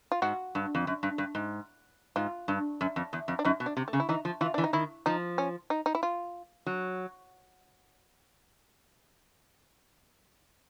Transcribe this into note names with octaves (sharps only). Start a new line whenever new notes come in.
F4
G#2 F#4
G2
F2
F#2
G2
G2
G#2
G#2 F4
G2
F#2
F2
E2
F2
D4
F#2 D#4
B2
D4
C3
A3
C#3
E4
E3 D#4
F3
E3 F4
E3 D4
D#4
D#3 E4
F3 D#4
C#4
D#4
D#4
E4
F4
F#3